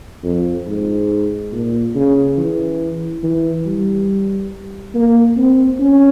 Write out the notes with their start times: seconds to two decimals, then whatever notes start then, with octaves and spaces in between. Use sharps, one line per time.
0.23 F2
0.67 G#2
1.52 A#2
1.95 C#3
2.37 E3
3.23 E3
3.66 G3
4.94 A#3
5.37 C4
5.79 C#4